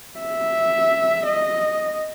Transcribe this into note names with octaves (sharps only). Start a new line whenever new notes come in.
E5
D#5